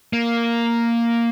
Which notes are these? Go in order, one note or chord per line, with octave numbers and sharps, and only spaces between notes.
A#3